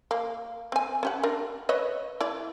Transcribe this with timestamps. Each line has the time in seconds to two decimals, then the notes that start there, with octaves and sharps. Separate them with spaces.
0.11 A#3
0.72 C4 G#5
1.03 C#4 G4 F#5
1.23 D4 A#4
1.69 B4 C#5 D#5
2.21 E4 D5